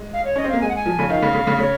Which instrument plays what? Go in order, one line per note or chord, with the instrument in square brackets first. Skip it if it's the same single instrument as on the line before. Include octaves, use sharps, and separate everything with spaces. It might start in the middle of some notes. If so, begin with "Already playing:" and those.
Already playing: [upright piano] G#3
[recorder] F5
C#5
[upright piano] C#4 [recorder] D#5
[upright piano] C4
[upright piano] A#3 [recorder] F5
[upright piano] G#3 [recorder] G#5
[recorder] F#5
G#5
[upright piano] F3
C#3
[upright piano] D#3 [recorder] F5
[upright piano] C#3
C#3
C#3
[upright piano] C#3 [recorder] C#5